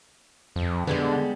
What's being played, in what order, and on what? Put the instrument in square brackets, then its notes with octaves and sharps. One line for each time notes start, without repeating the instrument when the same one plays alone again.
[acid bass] F2
[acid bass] D3 [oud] G3 G#3 B3